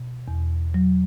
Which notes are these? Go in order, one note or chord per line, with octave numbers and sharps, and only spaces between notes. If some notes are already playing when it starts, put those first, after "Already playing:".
Already playing: B2
E2
F#3